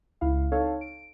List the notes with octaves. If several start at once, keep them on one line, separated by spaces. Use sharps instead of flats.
C#2 E4 F5
C4 D#4 A4 C#5 F5
D7